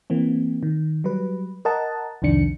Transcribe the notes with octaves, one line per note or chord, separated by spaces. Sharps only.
E3 A#3 C4
D#3
F#3 G3 B4
A#4 D#5 F#5 A5
C2 F2 D#3 D4 C#7